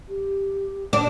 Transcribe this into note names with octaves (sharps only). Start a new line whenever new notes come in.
G4
D4